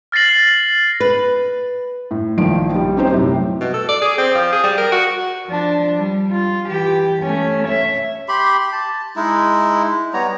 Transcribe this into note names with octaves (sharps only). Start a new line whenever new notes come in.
F6 A6 A#6 C7 F#7
B4
A2
A#1 D#3 F3 D7
A#1 G3
C4 C#4 D#4 G4 C5
F#2 A2 C3 F#3 G3
B2
A4
D5
G#4
C4
F3
G#4
G3
A#4
F#4
F3 D4
G3
F4
E3 G4
A3 C#4
C#5 E5
G4 B5 C6
A5
G#3 D#4 E4
G3 B3 C#5 A#5